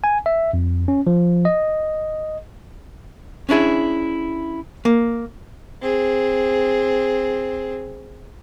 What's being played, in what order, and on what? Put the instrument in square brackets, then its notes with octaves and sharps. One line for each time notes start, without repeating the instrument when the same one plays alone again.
[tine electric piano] G#5
E5
F2
C#4
F3
D#5
[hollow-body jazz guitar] C#4 D4 E4 G#4
A#3
[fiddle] C4 G#4